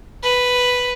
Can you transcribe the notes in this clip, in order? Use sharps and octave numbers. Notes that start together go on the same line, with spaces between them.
B4